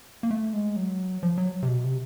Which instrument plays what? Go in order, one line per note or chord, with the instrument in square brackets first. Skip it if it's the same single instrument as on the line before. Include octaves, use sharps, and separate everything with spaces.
[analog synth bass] A#3
A3
G#3
F#3
F3
F#3
C3
B2
C3